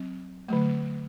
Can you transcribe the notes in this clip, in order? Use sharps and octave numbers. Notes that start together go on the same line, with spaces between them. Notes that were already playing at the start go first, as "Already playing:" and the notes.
Already playing: F#3 C4
D3 F#3 A3